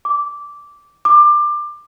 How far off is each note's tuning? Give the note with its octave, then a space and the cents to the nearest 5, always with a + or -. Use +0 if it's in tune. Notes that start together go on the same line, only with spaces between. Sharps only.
D6 -10
D6 +20